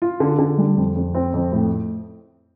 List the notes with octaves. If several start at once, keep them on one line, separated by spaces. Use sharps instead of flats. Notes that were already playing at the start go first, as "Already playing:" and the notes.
F4
D3
D3
G3
F2
F2
C4
F2
A2